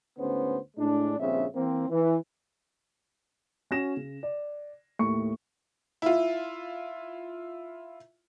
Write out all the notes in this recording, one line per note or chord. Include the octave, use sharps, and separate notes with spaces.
D2 G#2 B3 C#4 C5
A2 G#3 D4
A#1 G2 C#3 C4 E5
E3 A#3 C4
E3
C#4 F#4 A#6 E7
C#3
D5
D#2 A2 C#6 C#7
E4 F4